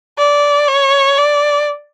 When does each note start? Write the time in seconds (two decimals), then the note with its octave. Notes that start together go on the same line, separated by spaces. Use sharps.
0.18 D5
0.68 C#5
1.18 D5